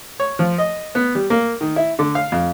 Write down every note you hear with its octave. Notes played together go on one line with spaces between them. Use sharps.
C#5
F3
D#5
B3
G3
A#3
D#3
E4
D3
F5
F2